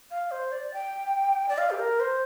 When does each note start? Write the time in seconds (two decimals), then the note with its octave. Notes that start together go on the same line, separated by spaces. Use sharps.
0.11 F5
0.31 C5
0.52 D5
0.74 G5
1.49 D5
1.58 F5
1.70 G4
1.79 A#4
2.00 C5